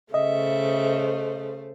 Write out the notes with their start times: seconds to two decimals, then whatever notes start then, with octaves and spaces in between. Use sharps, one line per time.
0.14 C#3 A3 C5 D#5 E5